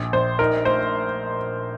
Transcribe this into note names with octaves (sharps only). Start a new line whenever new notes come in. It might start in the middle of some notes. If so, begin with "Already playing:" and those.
Already playing: A#1
A#1 C5
D#4 A#4
A3 C5